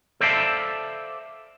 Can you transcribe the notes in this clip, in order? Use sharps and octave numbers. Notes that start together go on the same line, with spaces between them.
A4 C5 D5 E5 F5 A5